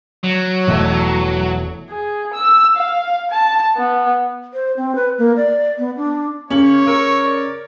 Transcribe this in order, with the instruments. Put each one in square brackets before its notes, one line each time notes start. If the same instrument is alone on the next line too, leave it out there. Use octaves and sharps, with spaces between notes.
[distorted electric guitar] F#3
[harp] E1 A3 E5
[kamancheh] G#4
E6
F5
A5
B3
[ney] C5
C4
B4
A#3
D5
B3
D4
[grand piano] C#3 F#7 [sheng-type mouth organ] A#3 [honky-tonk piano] C#4 [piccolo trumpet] C#5
[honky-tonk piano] A#4 [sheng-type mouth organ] C#6 E6
[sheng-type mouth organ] D5